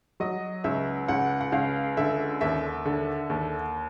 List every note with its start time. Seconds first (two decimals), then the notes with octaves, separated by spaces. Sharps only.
0.20 F#3 D#5
0.64 C#2 E5
1.08 C#2 F#5
1.41 F#5
1.52 C#2 F5
1.97 D3 E5
2.41 D#2 E5
2.85 D3
3.30 D#2